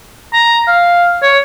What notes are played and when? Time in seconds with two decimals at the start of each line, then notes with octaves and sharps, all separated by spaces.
0.33 A#5
0.67 F5
1.22 C#5